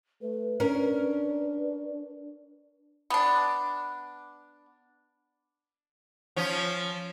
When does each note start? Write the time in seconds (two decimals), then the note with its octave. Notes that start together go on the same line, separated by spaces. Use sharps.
0.22 A3 B4
0.60 C#4 D4 A#4
3.10 B3 D4
6.36 F3 C#4